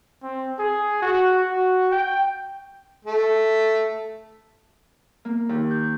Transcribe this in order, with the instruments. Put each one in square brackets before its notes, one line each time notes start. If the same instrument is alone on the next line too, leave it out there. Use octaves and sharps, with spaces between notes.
[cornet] C4
G#4
F#4
F#4
G5
[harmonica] A3
[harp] A#3
D#2
G6